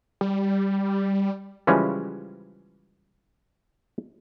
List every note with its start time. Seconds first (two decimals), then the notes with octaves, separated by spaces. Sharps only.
0.21 G3
1.67 C#3 E3 F3 G3 G#3 C#4